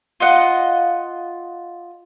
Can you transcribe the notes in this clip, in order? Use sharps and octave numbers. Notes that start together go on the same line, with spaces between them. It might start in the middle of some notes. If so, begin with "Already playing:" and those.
F4 D#5 F#5